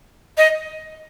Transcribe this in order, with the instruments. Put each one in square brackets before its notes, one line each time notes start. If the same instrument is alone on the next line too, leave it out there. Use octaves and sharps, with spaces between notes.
[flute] D#5